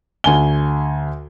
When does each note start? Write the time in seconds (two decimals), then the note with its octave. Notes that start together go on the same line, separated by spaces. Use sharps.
0.24 D2 G#5 G7